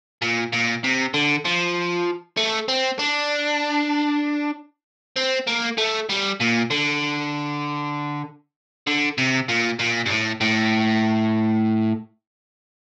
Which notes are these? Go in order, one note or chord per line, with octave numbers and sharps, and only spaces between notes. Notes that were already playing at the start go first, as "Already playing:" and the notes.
A#2
A#2
C3
D3
F3
A3
C4
D4
C4
A#3
A3
G3
A#2
D3
D3
C3
A#2
A#2
G2
A2
A2